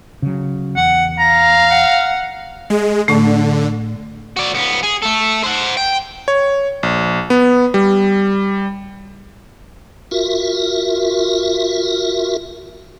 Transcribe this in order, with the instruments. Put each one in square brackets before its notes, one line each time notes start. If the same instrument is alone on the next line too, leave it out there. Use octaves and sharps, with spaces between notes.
[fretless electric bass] C#3 F#3
[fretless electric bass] E2 [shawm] F#5
[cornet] F5 [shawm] A#5
[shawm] F#5
[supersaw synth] G#3
[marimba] A2 A3 [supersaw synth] D3
[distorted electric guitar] F#4 D5
C#2 B3
G#4
A3 A4
C5 F#5
G5
[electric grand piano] C#5
A#1
B3
G3
[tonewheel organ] F4 F#4 A#4 E5